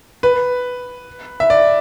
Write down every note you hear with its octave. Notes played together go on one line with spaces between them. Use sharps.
B4
E5
D5